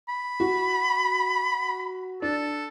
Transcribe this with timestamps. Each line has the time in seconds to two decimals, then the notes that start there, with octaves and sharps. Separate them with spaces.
0.09 B5
0.40 F#4
2.22 D4 A4